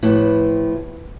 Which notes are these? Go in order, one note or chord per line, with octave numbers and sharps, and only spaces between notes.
A2 F3 B3 E4 G4